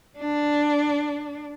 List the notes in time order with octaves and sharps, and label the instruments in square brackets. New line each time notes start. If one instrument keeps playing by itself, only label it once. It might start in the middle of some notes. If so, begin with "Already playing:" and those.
[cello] D4